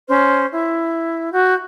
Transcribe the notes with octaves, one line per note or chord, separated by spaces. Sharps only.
C#4 C5 F6
E4
F#4 G6